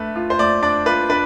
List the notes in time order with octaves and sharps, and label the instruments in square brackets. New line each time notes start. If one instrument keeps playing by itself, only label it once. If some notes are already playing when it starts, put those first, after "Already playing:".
Already playing: [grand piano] A3 D4 B4
F4
C5
A3 D5
D4 D5
F4 B4
D4 B4